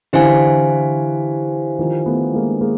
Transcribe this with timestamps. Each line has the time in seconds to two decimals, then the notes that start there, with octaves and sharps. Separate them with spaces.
0.13 D3 E3 E4 G4 C5 F5 G#5
1.79 D#3 F3
2.06 A3 B3
2.34 G#3 A#3
2.61 G#3 A#3